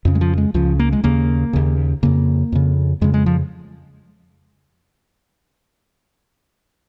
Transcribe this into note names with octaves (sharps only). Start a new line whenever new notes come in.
F2 C#3
G#3
F3
G#3
C#2 C#3 F3
A#3
G#3
D#2 C#3 A#3
D#2 C#3
F2 C#3 A#3
F2 C#3
F2 C#3 G#3
G#3
F3